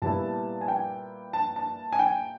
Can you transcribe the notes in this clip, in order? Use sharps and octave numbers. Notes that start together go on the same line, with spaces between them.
A#2 G3 B3 E4 A5
G#5
G5
A5
A5
G#5
G5